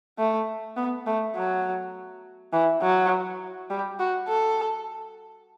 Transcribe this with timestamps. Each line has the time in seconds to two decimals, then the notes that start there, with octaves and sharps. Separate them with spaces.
0.18 A3
0.77 B3
1.07 A3
1.36 F#3
2.53 E3
2.82 F#3
3.70 G3
3.99 F#4
4.28 A4